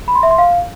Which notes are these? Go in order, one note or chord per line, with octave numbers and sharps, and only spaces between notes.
B5
C6
E5
C6
F5